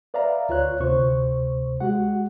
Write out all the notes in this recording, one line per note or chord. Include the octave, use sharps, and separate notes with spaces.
B4 D5 E5 F5 A#5
D2 F4 C#5 F#6
D2 C3 C5 C#6
G#3 F#4 G4 F#5